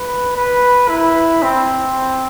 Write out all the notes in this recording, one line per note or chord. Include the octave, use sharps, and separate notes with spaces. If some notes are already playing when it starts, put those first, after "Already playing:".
Already playing: B4
B4
E4
C4